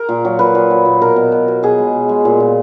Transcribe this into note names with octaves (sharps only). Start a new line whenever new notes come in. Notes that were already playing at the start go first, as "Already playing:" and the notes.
Already playing: A#4
A#2
F#3
A#2 B4
A#2
F#3
A#2
B2 A#4
B2
B2
B2
B2 G#4
G#3
B2
G#3
A#2
A#2